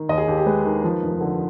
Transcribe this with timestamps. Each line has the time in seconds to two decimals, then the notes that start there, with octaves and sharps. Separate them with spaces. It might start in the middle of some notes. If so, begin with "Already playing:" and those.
Already playing: D#3
0.09 D#2 D#5
0.18 G#4
0.27 D#2 G4
0.38 G4
0.46 G#3 B4
0.65 D#3
0.84 F3
1.03 F1
1.21 D3